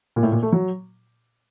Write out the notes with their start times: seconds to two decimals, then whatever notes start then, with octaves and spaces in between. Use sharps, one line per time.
0.16 A#2
0.23 A2
0.32 A#2
0.42 A3
0.52 F#3